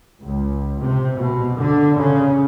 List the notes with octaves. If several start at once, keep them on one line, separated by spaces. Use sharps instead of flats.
C#2
C3
B2
D3
C#3